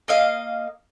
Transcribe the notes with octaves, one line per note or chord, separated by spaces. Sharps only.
A#3 D#5 F5